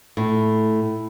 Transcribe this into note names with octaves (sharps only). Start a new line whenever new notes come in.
A2